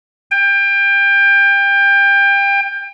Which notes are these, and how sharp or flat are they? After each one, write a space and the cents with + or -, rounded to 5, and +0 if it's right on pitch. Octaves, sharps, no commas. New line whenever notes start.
G5 +25